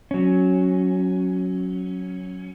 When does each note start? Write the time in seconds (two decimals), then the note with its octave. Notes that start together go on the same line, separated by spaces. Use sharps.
0.11 F#3 C#4